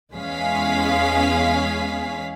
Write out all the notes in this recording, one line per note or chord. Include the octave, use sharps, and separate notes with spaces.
E2 G#3 C#4 G#4 F5 B6